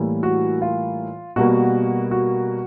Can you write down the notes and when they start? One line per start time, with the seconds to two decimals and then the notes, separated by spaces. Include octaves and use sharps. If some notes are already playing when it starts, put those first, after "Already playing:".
Already playing: A2 E3 G3 A#3
0.23 F#4
0.62 F4
1.36 B2 G3 A#3 F#4
2.11 F#4